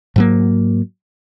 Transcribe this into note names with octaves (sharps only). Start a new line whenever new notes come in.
G#2 F#3 A#3